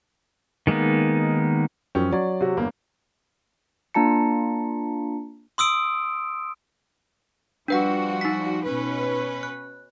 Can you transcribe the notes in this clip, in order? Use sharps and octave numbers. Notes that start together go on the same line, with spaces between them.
D#3 G#3 A#3 B3 D#4
F#2 F3 C#4 G5
F#3 C#5 D5
C3 F#4
G1 E2 A#3
A#3 D4 F4 A5 A#5 C#7
C6 D#6 E6 D7
F3 G3 D4 F#4 B4 F#5
D#4 B6
B2 C#4 B4
F#6